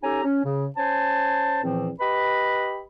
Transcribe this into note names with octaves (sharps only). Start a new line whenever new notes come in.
C#4 D#4 G4 A4 G#5 A#5
C#4
C#3
C#4 C5 G#5 A5
E2 A#2 E3 F3 C4
G4 B4 D#5 B5